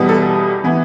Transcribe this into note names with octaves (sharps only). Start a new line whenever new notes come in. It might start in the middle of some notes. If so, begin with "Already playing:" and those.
Already playing: E2 B2 G3 B3
A4
E3 B3